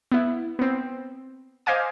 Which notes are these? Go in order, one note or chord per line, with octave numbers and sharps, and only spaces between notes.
B3 E4
B3 C4
C5 D#5 F5 G#5 D6